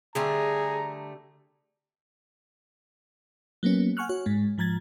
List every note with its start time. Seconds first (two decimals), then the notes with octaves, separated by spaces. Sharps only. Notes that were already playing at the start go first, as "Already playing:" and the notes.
0.15 D3 G3 A3 G#4 A#5
3.63 F#3 A#3 B3 C#4
3.97 F#5 G#5 C#6 F6 F#6
4.09 F#4 C#5
4.26 G#2 G#3
4.58 G#2 F3 A#5 G#6 A6